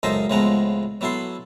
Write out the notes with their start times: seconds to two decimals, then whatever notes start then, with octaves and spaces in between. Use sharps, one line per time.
0.03 C#2 F#2 D#4 A4 C5 D#5
0.30 C#2 A2 F3 G#3 B3 A#5
1.01 F#3 B3 E4 A4 C6